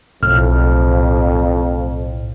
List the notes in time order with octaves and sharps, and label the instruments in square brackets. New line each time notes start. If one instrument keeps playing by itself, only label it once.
[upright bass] B1 [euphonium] F2 [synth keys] A2 [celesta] F6